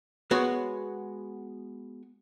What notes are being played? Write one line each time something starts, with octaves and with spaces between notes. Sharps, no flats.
G#3 B3 F#4 C#5